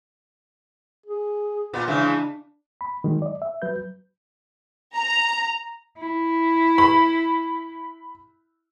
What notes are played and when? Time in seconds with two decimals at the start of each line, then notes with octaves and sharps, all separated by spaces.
1.06 G#4
1.73 A#2 B3
1.88 C#3 E3 G#3 D4
2.81 B5
3.04 D#3 F#3 G#3
3.22 D5 D#5
3.42 E5
3.62 F#3 B4 G6
4.94 A#5
5.97 E4
6.78 B5